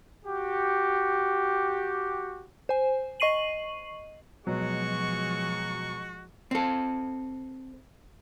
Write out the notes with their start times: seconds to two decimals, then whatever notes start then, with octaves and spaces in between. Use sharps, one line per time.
0.24 F#4 G4
2.69 C5 G#5
3.20 D#5 C#6 C7 D#7 F#7
4.47 B2 F3 F#3 G#3 F#4 C#6
6.51 C4 A4